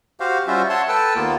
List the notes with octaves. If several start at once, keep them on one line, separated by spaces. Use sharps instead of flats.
F#4 G4 C5 F5
G3 C#4 F4 F#4 C5 E5
C#5 E5 F#5 A5 C6
A4 B4 G5 A5 E6
D#2 A#3 B3 F4